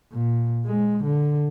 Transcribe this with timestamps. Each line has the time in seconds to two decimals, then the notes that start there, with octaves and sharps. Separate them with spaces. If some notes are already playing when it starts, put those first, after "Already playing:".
0.13 A#2
0.66 G#3
1.05 D3